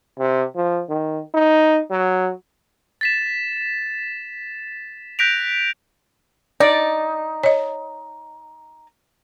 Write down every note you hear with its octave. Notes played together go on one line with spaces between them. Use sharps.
C3
F3
D#3
D#4
F#3
A6 B6 E7
F#6 G6 A#6 B6 D7 F7
D#4 D5
C#5 D#5